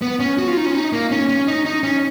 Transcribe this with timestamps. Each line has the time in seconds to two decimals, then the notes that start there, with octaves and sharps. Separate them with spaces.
0.02 B3
0.20 C#4
0.38 F#4
0.48 F4
0.57 D#4
0.66 C#4
0.75 D#4
0.93 A#3
1.11 C#4
1.29 C#4
1.48 D#4
1.66 D#4
1.83 C#4